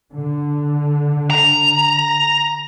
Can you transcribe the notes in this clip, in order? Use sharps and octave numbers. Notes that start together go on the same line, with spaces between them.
D3
A#5